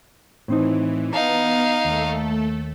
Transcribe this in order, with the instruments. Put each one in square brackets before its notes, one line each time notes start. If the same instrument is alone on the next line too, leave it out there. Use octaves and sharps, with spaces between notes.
[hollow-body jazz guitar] A2 C4 D#4 [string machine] E3
[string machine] B3 [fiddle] D#4 F5 [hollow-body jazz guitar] A5 A#5
[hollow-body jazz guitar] D#2 [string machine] A3 A4